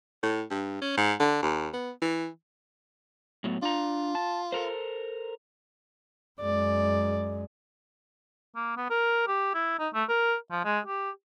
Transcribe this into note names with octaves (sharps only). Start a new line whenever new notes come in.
A2
G2
C#4
G#2
D3
D#2
B3
E3
A2 F#3 B3
D4 F4 A#5
A5
A4 A#4 C5
F#2 G#3 D5
A#3
B3
A#4
G4
E4
D#4
A3
A#4
F3
G#3
G4